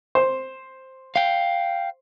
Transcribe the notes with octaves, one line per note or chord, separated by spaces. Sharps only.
C5
F5 G5